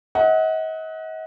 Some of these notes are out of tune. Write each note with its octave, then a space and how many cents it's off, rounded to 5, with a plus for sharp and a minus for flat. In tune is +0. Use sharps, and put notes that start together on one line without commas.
D#5 +40 F#5 +0